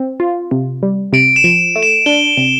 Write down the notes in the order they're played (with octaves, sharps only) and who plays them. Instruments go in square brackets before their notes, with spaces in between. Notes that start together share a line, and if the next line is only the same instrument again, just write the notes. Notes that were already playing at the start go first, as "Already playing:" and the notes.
Already playing: [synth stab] C4
F4
C3
G3
[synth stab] C3 [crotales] D7
[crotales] E7
[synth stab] F3
A3
[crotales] E7
[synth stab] D4 [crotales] G7
[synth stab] C3